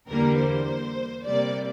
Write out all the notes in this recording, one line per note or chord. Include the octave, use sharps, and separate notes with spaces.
E2 D3 G3 A#3 A#4
C5
C3 G3 A#3 D5